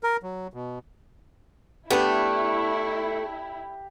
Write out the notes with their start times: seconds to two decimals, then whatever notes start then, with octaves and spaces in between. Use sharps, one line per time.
0.03 A#4
0.23 F#3
0.54 B2
1.90 A3 B3 D4 E4 G4